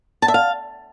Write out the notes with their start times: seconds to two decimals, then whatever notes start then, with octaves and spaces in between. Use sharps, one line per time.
0.22 A5
0.28 E5
0.34 F5